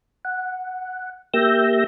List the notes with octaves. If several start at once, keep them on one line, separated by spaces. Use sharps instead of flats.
F#5
A#3 G4 E5 E6 G6 A#6